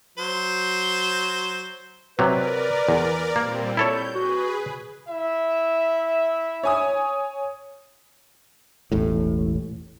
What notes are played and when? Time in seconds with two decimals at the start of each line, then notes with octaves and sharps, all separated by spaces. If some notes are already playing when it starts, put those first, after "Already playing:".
0.18 F#3 C5
2.19 C3 F#3 A#4 B4 D5
2.89 E2
3.36 A#2 G3 A#3 C4
3.77 E4 A4 C#5 G6
4.15 F#4 G#4 B4
5.08 E4 E5
6.63 C#5 G#5 D#6
8.92 E1 A1 A2